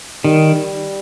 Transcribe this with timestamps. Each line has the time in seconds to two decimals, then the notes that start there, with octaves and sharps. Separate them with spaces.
0.24 D#3 G3